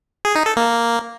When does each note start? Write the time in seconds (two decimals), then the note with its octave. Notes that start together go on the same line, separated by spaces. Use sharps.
0.25 G#4
0.35 D#4
0.46 A4
0.57 A#3